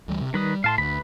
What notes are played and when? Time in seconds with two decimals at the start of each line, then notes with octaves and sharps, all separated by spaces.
0.08 D2 E3 G3
0.21 C3
0.34 D#3 G3 B4 D#6
0.64 A2 F5 A5 C6
0.78 D2 B4 B5